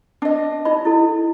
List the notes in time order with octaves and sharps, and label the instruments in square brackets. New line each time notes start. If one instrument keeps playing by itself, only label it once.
[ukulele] D4 D#5
[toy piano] D#4 B5 [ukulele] D#5
[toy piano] E4 A4